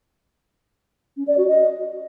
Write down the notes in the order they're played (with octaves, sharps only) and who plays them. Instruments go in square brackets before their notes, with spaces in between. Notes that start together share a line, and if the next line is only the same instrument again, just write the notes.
[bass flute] C#4
D5
F#4
D#5